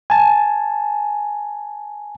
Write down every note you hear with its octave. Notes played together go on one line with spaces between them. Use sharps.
G#5 A5